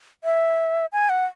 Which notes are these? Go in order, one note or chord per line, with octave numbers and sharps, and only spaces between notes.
E5
G#5
F#5